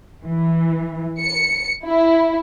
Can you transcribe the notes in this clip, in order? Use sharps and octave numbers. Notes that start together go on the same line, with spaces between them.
E3
C#7
E4